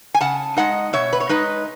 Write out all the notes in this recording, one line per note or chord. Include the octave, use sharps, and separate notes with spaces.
G#5
C#3 F#5 A5
G#3 D#4 D#5 F#5
B2 C#5 E5
B4
C#5
G#3 D#4 B4 D#5